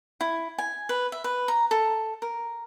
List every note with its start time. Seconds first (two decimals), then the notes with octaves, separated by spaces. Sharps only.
0.21 E4
0.58 G#5
0.89 B4
1.12 E5
1.24 B4
1.48 A#5
1.71 A4
2.22 A#4